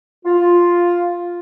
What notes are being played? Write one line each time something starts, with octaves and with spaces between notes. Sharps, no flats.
F4